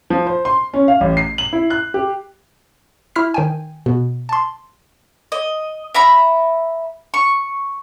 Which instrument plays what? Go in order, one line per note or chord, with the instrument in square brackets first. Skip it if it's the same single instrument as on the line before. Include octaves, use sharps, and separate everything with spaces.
[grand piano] F3
C5
C6
C#4
F5
A1
C7
F#7
E4
F#6
G4
[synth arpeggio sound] E4 F6 B6
D#3 G5 G#5
B2
A5 C6
[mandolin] D#5
E5 A#5 B5
C#6